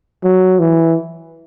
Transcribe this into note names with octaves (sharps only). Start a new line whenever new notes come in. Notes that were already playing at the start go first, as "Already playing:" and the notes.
F#3
E3